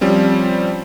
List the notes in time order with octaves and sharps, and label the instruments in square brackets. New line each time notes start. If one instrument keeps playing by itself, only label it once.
[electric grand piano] F3 G3 C4 C#4